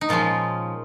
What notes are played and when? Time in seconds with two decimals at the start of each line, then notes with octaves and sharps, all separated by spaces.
0.01 D#4
0.09 A#2 F3 G#3 C#4 F4